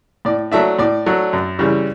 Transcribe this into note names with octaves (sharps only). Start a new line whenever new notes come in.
A2 D5
F#3 A3 D4 E5
A2 D5
F#3 A3 D4
F#2
C#3 E3 G3